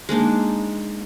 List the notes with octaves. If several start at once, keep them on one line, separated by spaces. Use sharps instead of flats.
G#3 A#3 D4 D#4